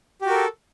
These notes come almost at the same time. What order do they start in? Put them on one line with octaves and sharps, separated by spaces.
G4 F#4 A#4 A4